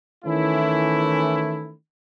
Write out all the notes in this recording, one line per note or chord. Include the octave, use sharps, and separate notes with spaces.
D#3 E3 A3 C#4 E4